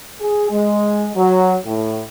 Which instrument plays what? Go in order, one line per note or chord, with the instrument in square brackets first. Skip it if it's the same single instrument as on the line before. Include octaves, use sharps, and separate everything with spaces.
[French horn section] G#4
G#3
F#3
A2